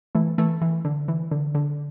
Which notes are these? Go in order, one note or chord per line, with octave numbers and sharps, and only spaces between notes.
E3 A3
E3 A3
E3
D3
E3
D3
D3